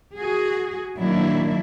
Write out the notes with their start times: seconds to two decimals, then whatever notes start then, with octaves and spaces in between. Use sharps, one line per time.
0.17 F#4 G#4
0.97 A#2 D#3 F#3 A#3 D4 E4